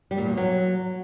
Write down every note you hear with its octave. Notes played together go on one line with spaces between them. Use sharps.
G3
A#2
E2
B2
F#3